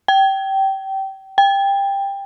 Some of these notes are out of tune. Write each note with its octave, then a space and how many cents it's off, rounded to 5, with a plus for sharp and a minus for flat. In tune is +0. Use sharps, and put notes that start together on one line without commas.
G5 -20
G5 +15